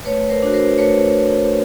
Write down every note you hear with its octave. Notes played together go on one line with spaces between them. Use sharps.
A3 B4 C#5
A#4 C5
D4 F#4
A#4 C5
A3 B4 C#5